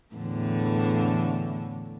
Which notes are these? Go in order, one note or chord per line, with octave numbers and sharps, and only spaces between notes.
E2 A2 D3